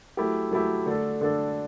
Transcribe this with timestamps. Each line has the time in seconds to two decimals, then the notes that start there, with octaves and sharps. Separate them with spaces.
0.17 F#3 A3 E4 G4
0.51 F#3 A3 E4 G4
0.86 D3 A3 D4 A4
1.21 D3 A3 D4 A4